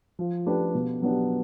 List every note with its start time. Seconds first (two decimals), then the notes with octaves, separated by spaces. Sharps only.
0.19 F3
0.47 A3 D4 G4 B4
0.75 B2
1.02 F#3 B3 D4 G4